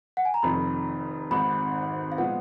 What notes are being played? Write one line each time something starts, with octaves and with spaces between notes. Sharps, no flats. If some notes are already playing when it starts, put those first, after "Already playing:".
F#5
G#5
A#5
F1 F2 D#3 B5
G#1 G#2 D#3 B5
F5
A#2 F3 G#3 B3 F#5